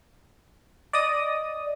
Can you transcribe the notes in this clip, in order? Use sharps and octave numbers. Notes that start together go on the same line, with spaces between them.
D5 D#5 D#6